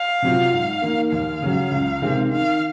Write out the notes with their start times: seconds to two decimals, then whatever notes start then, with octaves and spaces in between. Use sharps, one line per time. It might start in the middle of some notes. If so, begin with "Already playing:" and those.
Already playing: F5
0.22 C3 F#3 C4 F4
0.52 G#2
0.82 D#3 A#3
1.12 D#2 F5
1.42 C#3 F#3
1.71 C#2
2.02 C3 D#3 G#3 C4
2.31 D#3 F5